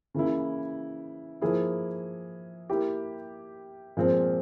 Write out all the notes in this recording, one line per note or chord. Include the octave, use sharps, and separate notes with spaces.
C#3 E3 A#3 E4
F3 A#3 E4 G#4
A#3 E4 G4
A#2 F3 G#3 C4